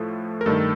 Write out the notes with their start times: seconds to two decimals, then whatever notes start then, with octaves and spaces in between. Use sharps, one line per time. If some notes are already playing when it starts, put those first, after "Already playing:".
Already playing: A2 F3 A3 A4
0.41 A#4
0.46 G2 D#3 A3 A4